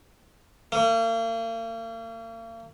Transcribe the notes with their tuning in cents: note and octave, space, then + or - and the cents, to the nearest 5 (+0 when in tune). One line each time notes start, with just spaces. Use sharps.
A#3 -40